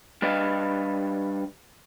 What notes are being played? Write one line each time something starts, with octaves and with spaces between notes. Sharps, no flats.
G3 D4 B4 D#5 F5